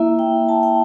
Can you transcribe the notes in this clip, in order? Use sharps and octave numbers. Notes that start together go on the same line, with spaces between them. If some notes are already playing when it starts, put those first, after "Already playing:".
Already playing: A#3 E4 E5
G5
A5
G5